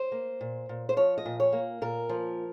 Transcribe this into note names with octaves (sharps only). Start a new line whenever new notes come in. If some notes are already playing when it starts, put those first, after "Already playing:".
Already playing: C5
A#3
A#2
A#2
C5
F3 C#5
D#5
A#2
C#5
A#3
A#2 A#4
F3